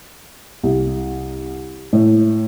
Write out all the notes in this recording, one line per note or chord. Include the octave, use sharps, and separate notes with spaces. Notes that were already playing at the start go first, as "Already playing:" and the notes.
C2
A2